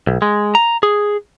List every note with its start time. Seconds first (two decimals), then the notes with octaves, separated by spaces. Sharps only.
0.07 B1
0.22 G#3
0.55 A#5
0.83 G#4